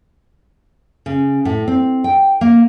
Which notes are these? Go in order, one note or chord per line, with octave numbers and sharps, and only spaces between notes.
C#3
A2
C4
G5
A#3